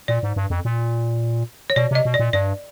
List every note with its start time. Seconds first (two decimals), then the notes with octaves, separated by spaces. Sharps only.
0.08 A#2 D5
0.23 G#2
0.36 G2
0.50 F2
0.65 A#2
1.70 C#5
1.76 B2 D5
1.91 C3 D#5
2.05 B2
2.14 D5
2.19 A#2
2.33 G2 D5